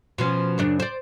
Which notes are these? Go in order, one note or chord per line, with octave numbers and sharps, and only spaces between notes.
B2 F3 C#4
F#2 C#3 D4
C5 D5